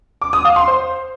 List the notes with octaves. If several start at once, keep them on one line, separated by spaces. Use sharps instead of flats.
D6
D#6
F5
C6
C5